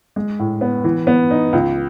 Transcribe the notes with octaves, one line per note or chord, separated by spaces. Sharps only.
G#3
A2
B3
E3
B3
D#4
C#2